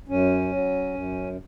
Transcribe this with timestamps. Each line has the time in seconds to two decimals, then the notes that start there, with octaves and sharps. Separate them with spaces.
0.08 F#2 C#4
0.52 F#3
0.94 F#2